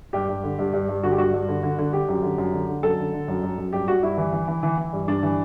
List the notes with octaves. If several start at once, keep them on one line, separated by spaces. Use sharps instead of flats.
G2 G4
G2
D3
G2
G2
G2
D3 F#4
G4
G2 F#4
G2
D3
D3
D3
D3 G4
F#2
D3
F#2
D3
D3
F#2 A4
D3
D3
F#2
F#2
F#2
G2 G4
G2 F#4
G2 E4
E3
E3
E3
E3
E3
G2
G2 D4
E3